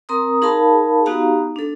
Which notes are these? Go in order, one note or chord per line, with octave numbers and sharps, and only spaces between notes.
C4 A#4 A#5 C6 D#6
D#4 G#4 A#4 F5 A5 B5
B3 D#4 F#4 G4 F5 A#5
D4 A4